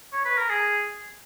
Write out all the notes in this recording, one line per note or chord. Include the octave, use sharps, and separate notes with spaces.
C#5
B4
A#4
G#4